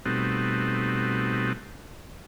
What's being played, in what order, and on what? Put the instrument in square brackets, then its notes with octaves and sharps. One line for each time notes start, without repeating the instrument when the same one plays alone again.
[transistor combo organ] B2 G3 A3 C4 D#4 F#4